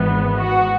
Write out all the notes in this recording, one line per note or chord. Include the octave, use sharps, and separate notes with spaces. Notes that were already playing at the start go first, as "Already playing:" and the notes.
Already playing: G#1 G#2 E3 B3
F#4